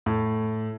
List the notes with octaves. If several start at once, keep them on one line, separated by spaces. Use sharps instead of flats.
A2